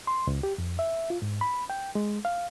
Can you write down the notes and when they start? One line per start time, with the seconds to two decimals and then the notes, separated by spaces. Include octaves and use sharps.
0.07 C6
0.27 C#2
0.43 G4
0.58 F2
0.79 E5
1.10 F4
1.22 G#2
1.41 B5
1.70 G5
1.95 G#3
2.25 F5